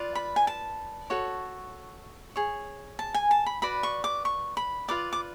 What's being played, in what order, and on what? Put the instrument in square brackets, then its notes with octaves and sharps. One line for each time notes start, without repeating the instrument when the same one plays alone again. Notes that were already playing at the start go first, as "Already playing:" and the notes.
Already playing: [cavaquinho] F4 B4 D5
B5
G#5
A5
F#4 A4 C#5
G#4 C#5
A5
G#5
A5
B5
F#4 B4 D5 B5
C#6
D6
C#6
B5
F4 B4 D5 D6
D6